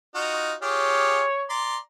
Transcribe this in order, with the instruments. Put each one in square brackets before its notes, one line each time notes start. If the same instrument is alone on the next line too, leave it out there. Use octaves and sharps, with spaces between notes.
[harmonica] D#4 F4 F#4
[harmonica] F4 G4 G#4 [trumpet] C#5
[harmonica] D5 A#5 C6